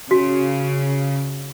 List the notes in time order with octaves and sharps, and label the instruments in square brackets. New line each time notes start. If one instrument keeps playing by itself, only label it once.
[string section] C#3 [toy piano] F#4